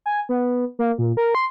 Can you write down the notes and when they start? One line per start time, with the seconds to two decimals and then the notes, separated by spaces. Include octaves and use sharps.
0.06 G#5
0.29 B3
0.79 A#3
0.98 A#2
1.17 A#4
1.35 C6